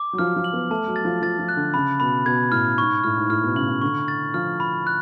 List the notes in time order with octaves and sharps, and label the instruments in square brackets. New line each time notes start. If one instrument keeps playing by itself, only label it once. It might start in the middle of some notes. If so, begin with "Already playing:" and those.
Already playing: [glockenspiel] D6
[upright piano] F#3
[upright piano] F3 [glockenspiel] F6
[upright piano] F3
[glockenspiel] F#7
[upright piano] B3
[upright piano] A3 [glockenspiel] A5
[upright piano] F#3
[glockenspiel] A6
[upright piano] F3
[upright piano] F3 [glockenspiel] A6
[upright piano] F3
[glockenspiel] F#6
[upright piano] D3
[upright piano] C#3 [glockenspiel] B5
[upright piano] B2 [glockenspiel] B5
[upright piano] B2 [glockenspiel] G#6
[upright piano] A2 [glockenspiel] F6
[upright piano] G#2 [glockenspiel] C#6
[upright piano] A2 [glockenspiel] F6
[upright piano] G#2
[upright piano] A2 [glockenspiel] F6
[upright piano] B2
[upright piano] C#3 [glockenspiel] F#7
[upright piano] C#3
[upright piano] D3 [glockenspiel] C#6
[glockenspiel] A6
[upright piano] F3 [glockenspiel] F6
[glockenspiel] B5
F#6